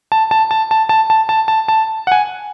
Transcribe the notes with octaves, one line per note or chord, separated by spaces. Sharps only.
A5
A5
A5
A5
A5
A5
A5
A5
A5
F#5
G#5